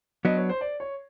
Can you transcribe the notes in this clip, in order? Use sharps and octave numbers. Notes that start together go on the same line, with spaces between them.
F#3 B3 D4 D#5
C#5
C5
D5
C#5